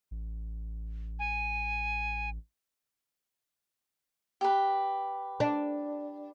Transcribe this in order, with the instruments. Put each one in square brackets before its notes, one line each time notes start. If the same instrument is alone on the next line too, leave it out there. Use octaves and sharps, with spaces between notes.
[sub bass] A1
[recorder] G#5
[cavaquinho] G4 B4
[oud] D4